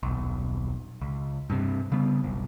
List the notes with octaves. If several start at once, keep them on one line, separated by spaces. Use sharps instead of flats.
D#1 B1
C#2
G2 C3
C#3 G3 B3
F#1 B1